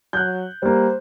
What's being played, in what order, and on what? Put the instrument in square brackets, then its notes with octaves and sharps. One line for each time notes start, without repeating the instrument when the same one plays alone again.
[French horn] F#3 [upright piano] F#6 G6
[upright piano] G3 A#3 [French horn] C5